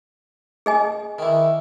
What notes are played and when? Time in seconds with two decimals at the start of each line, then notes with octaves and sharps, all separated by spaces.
0.66 G#4 D#5 G#5
1.19 D#3 E3